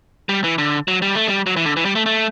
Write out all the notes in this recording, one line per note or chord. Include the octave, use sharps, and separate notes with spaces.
G3
E3
D3
F#3
G3
A3
G3
F#3
E3
D3
E3
G3
A3
A3